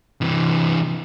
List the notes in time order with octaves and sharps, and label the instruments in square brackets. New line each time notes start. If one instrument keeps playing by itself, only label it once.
[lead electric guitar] C3 E3